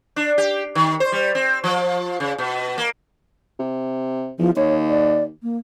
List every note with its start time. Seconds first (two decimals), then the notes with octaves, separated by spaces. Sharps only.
0.16 D4
0.38 G4
0.75 D#3
1.00 C5
1.12 G3
1.35 C4
1.64 F3
2.20 C#3
2.38 B2
2.78 A#3
3.59 C3
4.39 E2 F3
4.56 D#2 C#5
4.90 D5
5.43 A#3